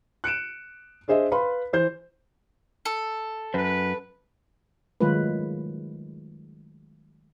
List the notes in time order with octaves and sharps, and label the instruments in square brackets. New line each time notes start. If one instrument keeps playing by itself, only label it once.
[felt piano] F#6 C#7 D7 E7
D4 G#4 C5 D#5 E5
B4 F5 B5 C6
E3 C5 G6
[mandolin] A4
[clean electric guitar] F#2 [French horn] B4
[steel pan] D#3 F#3 G#3 A3 F4 B4